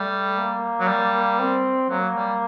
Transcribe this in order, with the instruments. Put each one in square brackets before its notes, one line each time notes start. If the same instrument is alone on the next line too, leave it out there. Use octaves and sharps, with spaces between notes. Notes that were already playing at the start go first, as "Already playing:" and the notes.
Already playing: [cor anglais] G3 [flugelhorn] A3
[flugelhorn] A#3
[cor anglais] F#3
G3
[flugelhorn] C4
[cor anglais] F#3 [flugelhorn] A#3
[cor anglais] G3